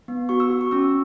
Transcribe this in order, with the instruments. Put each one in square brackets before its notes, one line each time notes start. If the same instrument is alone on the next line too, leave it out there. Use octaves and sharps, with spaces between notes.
[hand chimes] B3
F#4 C#6
E6
F#4
C#6
C#4 E6